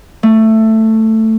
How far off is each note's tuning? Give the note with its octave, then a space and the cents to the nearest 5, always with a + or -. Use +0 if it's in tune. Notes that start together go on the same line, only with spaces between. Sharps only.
A3 +10